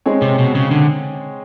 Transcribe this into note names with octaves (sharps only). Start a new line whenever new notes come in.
G#3 C4 D#4 G#4 C#5
C3
B2
C#3
D3